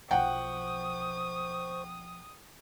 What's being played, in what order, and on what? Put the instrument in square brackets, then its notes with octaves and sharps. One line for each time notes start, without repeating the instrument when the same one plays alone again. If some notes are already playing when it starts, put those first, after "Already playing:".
[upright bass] B1 F3 [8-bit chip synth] C5 C#6 [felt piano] F#5 G5 [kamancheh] D#6